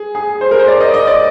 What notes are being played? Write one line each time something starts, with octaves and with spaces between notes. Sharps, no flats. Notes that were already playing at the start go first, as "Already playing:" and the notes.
Already playing: G#4
G#4
C5
A#4
C5
D5
D#5
D5
D#5
D5